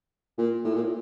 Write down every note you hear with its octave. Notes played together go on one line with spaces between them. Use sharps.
A#2
A2
A#2